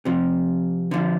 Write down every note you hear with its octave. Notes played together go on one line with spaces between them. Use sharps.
C3 F3
D3 F3